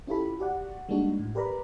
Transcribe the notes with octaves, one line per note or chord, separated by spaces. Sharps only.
C#4 E4 F4 G4 A4 B5
F#4 G4 D5 F#5
G3 G#3 A#3 D4 D#4 F#4
A2
G4 A#4 B4 D5 A#5 B5